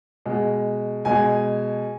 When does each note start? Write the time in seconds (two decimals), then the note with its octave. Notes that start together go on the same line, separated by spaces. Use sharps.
0.26 B2 G#3
1.05 B2 G#3 G#5